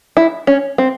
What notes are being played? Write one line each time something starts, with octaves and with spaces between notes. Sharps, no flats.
E4
C#4
C4